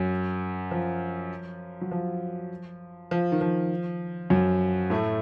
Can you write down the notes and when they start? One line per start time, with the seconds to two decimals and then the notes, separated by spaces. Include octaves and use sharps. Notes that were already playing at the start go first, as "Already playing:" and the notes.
Already playing: F#2 F#3
0.71 F3
1.81 F#3
1.91 F3
3.11 F3
3.32 D#3
3.41 F3
4.30 F#2 F#3
4.90 A2 A3